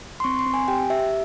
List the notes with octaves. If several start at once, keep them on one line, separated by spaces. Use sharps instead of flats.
C6
C4 C#6
C6
C4
G#5
G4 G5
G4 E5